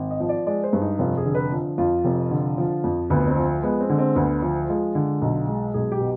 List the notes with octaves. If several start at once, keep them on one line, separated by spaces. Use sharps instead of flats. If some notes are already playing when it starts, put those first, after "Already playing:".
Already playing: G#1
D#5
F3
D5
G#3 D5
C5
G2
D#4
F1 F4
G#4
D3
B4
F3
F2 F4
F1
D3
F3
F2
D2 B3
C4
F3
G#3 B3
C4
D3
C4
D2 B3
F3
G#3 F4
D3
B1
G#3
B1 G#4
G4
B2